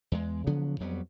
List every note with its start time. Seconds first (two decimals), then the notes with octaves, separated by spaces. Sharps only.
0.12 E2 G#3
0.47 C#3 F3 F#3 B3
0.80 F2 F#3 G3 B3